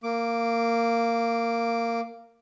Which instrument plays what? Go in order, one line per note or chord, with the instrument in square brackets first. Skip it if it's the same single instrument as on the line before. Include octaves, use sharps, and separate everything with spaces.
[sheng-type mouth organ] A#3 D6